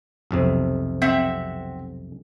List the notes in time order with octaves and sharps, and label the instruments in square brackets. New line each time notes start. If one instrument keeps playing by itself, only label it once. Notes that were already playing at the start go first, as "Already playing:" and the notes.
[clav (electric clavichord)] B1 F2 C3
[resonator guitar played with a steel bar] C4 E5 F#5